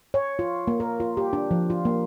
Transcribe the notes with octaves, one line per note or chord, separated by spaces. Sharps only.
C#5
F4
A#3
A#4
F4
G4
D4
F3
F4
A#3